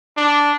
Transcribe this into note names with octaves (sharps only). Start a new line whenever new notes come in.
D4